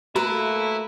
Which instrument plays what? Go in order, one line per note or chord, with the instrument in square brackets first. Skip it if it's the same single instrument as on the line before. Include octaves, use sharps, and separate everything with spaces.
[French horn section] A3 A#3 [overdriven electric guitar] E4 [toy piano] F#4 [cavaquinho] B4 A#5